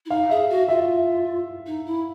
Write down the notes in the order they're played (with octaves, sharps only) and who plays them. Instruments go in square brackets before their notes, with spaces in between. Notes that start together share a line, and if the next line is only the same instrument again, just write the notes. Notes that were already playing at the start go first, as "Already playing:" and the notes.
[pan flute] E4
[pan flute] D#4 [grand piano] F5
[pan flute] G#4 [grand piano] E5
[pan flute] F#4
[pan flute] F4 [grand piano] E5
[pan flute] D#4
E4